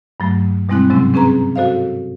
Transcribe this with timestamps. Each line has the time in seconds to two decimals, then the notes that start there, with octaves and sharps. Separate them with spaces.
0.20 G2 F#3 A3
0.69 B2 G3 G#3 C4 E4 F#6
0.90 G#2 C3 F#3 G#3 C4 C#4
1.14 C4 C#4 G#4 B4 A#5
1.56 F#4 A4 C5 D#5 F5